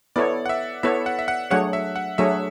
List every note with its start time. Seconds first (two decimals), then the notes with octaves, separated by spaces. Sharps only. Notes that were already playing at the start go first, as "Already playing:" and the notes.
0.16 B3 E4 A4 C#5 D5
0.46 F#5
0.49 E5
0.83 B3 E4 A4 C#5 E5
1.06 F#5
1.19 E5
1.28 F#5
1.51 F#3 A3 D4 G#4 C#5 F#5
1.73 E5
1.96 F#5
2.18 F#3 A3 D4 G#4 C#5 E5